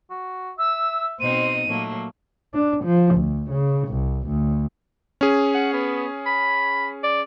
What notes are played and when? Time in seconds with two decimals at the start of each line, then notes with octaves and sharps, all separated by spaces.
0.10 F#4
0.58 E5 E6
1.20 B2 C4 D#4 C5 D#7
1.68 A#2 F#3 A3 A#3
2.54 D4
2.84 F3
3.14 D2
3.50 C#3
3.88 C2
4.27 D2
5.21 C#4 G#4
5.55 F#5
5.73 B3
6.26 B5
7.03 D5